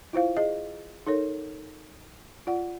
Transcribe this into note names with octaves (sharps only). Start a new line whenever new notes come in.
E4 F4 C5 F5
G#4 D#5
D#4 A4 A#4 C#5
F4 D5 F#5